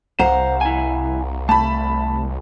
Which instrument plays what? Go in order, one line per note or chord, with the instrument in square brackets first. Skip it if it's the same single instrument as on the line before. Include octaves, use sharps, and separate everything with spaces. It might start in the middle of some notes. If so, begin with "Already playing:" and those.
[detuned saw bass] C2 [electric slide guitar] C5 [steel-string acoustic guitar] F5 F#5 A#5
[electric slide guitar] E4 G#5
[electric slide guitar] A3 [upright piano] A5 B5